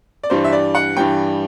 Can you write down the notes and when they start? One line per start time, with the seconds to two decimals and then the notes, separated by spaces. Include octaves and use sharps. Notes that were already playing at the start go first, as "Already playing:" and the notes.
0.23 D5
0.30 G2 E3 G3 C5
0.44 E5
0.53 D5
0.75 F#5
0.97 G2 E3 G3 G5